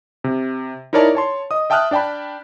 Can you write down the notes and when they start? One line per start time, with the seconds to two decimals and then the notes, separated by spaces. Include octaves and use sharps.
0.24 C3
0.93 D#4 E4 A#4 C#5 D5 A5
1.15 C#5 A5 C6
1.51 D#5 D#6
1.70 E5 G5 A5 D#6 F6 F#6
1.91 D4 D5 G5 A5 B5